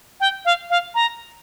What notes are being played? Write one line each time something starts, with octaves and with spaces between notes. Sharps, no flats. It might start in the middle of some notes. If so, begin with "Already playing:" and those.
G5
F5
F5
A#5